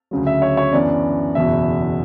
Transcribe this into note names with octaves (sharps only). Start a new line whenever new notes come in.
D2 C#3 F#3
E5
C#5
C#5
F#2 E3 B3 D4 D5
F#1 E2 B2 E5